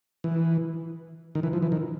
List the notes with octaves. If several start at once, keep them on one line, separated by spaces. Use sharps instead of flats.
E3
D#3
E3
F3
E3
D#3